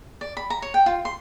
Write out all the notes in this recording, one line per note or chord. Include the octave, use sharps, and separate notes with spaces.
D5
B5
A#5
C#5
G5
F4
C6